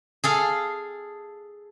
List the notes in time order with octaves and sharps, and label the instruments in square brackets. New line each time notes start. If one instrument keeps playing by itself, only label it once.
[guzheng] G#4 A4 F5